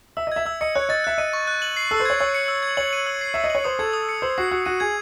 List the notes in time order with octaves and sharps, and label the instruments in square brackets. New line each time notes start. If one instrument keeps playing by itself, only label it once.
[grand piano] E5 [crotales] E6
[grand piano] D#5
[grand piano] E5 [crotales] G#6
[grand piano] E5 [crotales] E6
[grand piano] D#5 [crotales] C#7
[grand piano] C#5 [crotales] F#6
[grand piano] D#5 [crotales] A6
[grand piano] E5 [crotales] F#6
[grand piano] D#5 [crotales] D#7
[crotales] C#6
F#6
F#7
C7
[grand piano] A4 [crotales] E6
[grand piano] C5
[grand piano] C#5 [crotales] G#6
[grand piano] C#5 [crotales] E6
[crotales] C#7
E6
G#6
[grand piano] C#5 [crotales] F#7
[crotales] D#7
E6
C7
[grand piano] E5 [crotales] E6
[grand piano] D#5
[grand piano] C#5 [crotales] F#7
[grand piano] C5 [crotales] D#6
[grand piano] A4 [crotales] G#6
[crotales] D#6
C#7
[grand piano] C5 [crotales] E6
[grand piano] F#4 [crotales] C7
[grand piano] F#4 [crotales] E6
[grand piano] F#4 [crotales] D#7
[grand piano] G#4 [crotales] G#6